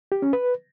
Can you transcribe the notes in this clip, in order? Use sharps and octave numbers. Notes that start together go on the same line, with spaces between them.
G4
C#4
B4